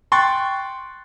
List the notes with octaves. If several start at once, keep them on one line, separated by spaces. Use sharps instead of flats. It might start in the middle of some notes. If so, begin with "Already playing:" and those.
G5 C6 C#6 F#6 A6